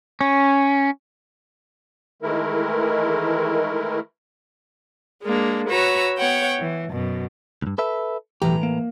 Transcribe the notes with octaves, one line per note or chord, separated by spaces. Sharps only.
C#4
D#3 E3 G#3 A3 E4 A#4
G#3 A#3 D4
F#4 B4 C#5 A#5 E6
B3 C#5 F#5 G5
E3
F#2 B2
C#2 G2
A4 B4 E5
B1 A2 E3 G4 A#5
A#3